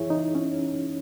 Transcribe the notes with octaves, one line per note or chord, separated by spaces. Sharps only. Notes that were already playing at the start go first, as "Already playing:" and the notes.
Already playing: F#2 E3 E4 G#4 C#5
D#4
C#4